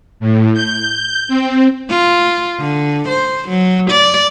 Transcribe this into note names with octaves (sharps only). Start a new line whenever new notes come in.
A2
G6
C4
F4
D3
C5
F#3
D5